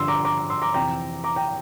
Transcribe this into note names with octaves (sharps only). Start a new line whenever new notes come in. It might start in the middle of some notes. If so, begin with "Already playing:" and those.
Already playing: G2 D3 F3 C6 E6
A#5 D6
A#5 D6
C6 E6
A#5 D6
F2 C3 E3 G5 A#5
A#5 D6
G5 A#5